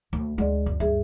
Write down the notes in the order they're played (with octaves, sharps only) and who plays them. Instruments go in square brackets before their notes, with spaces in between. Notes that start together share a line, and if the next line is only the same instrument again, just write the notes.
[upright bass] D2
[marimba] D2 D5 [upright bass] G#3
[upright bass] F#2
[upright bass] G2 [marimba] G#4 E5